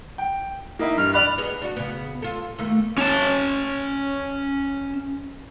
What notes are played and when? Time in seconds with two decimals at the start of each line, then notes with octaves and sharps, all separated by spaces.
0.18 G5
0.79 A#3 D#4 E4
0.98 G2 F6
1.14 D5 B5 F#6 F7
1.38 B3 F#4 G#4
1.62 D4 F#4
1.76 C#3 B3
2.22 F4 A4
2.58 D#2 A3 A#3
2.98 C#4 A5